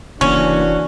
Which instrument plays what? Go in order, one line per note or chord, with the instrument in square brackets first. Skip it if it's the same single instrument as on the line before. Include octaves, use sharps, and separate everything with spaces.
[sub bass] F1 [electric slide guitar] C#3 A#3 [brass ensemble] E3 D4 F#4 [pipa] C#4